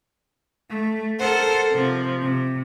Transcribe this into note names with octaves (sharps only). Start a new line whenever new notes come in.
A3
A4 A#4 C5 F#5
C3 F3
C3